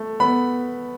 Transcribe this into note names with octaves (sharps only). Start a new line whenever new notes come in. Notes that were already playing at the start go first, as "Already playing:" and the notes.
Already playing: A3
B3 B5